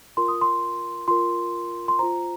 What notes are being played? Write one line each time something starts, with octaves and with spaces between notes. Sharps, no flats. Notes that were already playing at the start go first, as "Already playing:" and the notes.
F4 A#4 C6
D#6
C6
F4 A#4 C6
C6
F4 C5 A#5